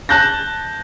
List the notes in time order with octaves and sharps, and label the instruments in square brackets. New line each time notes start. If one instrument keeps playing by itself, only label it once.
[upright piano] A5 F#6 G6 A#6